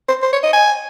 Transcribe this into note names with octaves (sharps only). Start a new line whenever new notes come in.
C5
C5
C#5
D#5
G#5